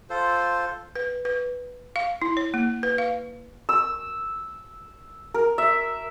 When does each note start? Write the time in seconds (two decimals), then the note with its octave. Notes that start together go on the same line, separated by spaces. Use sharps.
0.10 F4 A4 C5
0.96 B4
1.25 B4
1.96 F5
2.22 E4
2.37 C#5
2.54 A#3
2.83 B4
2.98 F5
3.69 E6
5.34 A#4
5.58 E5